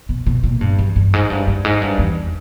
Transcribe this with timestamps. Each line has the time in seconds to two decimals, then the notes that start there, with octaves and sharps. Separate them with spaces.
0.09 B2
0.26 B2
0.44 A#2
0.61 G2
0.78 E2
0.96 G2
1.13 G#2
1.30 G2
1.47 G2
1.64 G#2
1.82 G2
1.98 E2